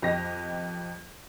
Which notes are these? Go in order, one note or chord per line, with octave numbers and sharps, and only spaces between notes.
F2 G4 D#5 A#6